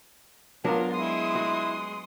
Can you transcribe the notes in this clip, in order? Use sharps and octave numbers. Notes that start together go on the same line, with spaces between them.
F#3 B3 D4 F4 A#4
G#3 E4 C6 D#6
F#4